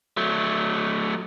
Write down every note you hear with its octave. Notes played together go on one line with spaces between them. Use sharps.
F#3 A3